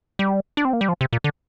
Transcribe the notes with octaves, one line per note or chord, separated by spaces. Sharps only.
G3
D4
C4
A#3
G3
F3
C3
A#2
D3